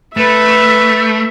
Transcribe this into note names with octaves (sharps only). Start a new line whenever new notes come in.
A3 B4 E5